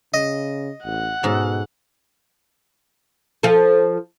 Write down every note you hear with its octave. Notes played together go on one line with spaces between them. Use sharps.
C#3 D#5
A1 F#5
G#2 B2 A4
F3 F4 A4